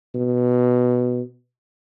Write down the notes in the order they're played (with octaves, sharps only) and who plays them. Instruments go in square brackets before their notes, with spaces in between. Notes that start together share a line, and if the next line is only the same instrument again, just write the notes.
[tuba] B2